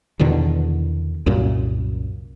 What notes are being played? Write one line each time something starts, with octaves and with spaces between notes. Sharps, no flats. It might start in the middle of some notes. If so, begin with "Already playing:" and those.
E2 B2 D3 D#3
C2 F#2 A#2